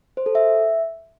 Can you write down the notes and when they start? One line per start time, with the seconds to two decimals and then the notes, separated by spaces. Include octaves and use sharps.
0.17 C5
0.26 A4
0.35 E5